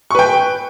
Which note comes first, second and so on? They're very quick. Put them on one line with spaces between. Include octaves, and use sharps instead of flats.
C#6 B4 G5